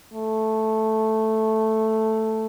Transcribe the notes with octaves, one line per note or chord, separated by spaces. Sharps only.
A3